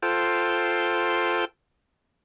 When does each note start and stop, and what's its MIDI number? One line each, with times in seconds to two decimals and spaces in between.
0.02 1.45 65
0.02 1.45 69
0.02 1.45 72
0.02 1.45 79